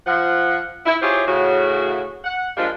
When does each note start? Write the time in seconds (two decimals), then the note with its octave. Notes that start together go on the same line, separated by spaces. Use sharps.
0.07 F3 F#5
0.86 E4
1.02 E4 F4 G4 G#4 C5 C#5
1.27 A2 C#3 F#4
2.24 F#5
2.57 F3 G3 G#3 A#3 D4 F4